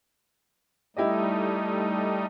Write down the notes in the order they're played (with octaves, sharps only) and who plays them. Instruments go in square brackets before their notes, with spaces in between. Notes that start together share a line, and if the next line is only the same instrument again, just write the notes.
[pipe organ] G3 A3 D#4 [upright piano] E4 G4 D#5